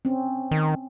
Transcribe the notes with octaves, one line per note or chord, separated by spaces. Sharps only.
C4 C#4
D#3